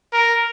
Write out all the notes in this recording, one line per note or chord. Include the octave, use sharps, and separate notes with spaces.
A#4